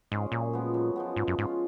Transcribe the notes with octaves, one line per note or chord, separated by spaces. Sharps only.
G#2 G#3 C#4 G#4
F#2 A#2
F3 G#3 B3
F#2
F3 G#3 B3
G#2 G#3
F#2
G#2 C#4 F4